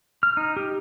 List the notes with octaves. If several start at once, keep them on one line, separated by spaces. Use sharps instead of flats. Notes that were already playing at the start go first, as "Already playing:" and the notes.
F6
D#4
G4